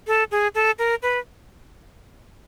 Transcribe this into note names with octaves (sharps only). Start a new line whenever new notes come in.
A4
G#4
A4
A#4
B4